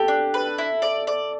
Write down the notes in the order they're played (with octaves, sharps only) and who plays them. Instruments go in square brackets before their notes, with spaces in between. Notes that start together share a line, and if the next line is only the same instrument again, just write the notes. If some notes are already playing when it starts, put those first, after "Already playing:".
Already playing: [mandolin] G4 [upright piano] A4
[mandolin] D4
B4
E4
D5
D5